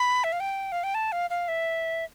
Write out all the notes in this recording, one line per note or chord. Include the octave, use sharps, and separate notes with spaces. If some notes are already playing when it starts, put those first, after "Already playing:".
Already playing: B5
E5
F5
G5
F5
G5
A5
F5
F5
E5